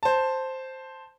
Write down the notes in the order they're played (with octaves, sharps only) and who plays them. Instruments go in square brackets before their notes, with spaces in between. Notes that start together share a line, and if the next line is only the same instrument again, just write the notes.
[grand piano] C5 A5